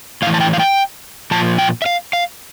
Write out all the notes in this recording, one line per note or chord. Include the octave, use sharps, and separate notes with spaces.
A2 E3 F5
A5
G5
F5
G5
A#2 F3 A5
G5
E5
F5
F5